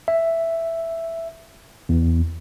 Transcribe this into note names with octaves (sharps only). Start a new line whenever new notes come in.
E5
E2